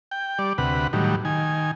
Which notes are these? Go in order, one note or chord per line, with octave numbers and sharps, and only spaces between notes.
G5
G3 D5
D2 C3 B4 F#5
A2 D#3 F#3 G3
D#3 G#5